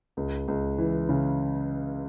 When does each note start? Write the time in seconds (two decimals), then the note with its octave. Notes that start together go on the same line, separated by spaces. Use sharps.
0.17 C#2
0.48 C#2
0.78 E3
1.09 C#3